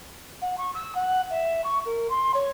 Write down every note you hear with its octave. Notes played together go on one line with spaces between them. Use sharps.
F#5
C#6
E6
F#5
E5
C#6
A#4
C6
C#5